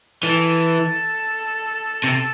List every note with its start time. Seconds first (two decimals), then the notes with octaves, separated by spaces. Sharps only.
0.23 E3 A4
2.04 C3